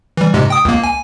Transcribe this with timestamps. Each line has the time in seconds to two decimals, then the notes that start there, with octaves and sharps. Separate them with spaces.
0.17 E3 G3
0.34 G#2 C3 G#3
0.50 G5 D#6
0.65 C#2 A#3
0.84 G#5